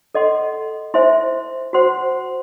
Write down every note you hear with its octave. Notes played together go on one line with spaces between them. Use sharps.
A4 D#5 F#5 C6
E4 C5 E5 G#5 C6
F#4 C5 F#5 C6